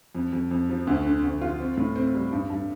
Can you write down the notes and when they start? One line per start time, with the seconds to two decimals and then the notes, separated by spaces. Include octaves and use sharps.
0.15 F2
0.33 F2
0.51 F2
0.69 F3
0.87 D2
1.05 D3
1.24 D2
1.41 F4
1.60 C4
1.77 A2
1.96 C4
2.15 G3
2.32 G2
2.50 G2